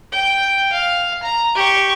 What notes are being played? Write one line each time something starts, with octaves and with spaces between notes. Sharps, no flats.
G5
F5
A#5
G4 C#6